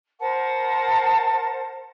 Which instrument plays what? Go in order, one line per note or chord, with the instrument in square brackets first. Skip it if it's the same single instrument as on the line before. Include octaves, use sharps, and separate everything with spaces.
[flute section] A#4 C5 F#5 A5